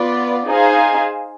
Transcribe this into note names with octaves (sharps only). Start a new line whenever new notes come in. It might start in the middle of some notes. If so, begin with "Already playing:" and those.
Already playing: B3 F4 B4 D5
D#4 G#4 C5 F5 G#5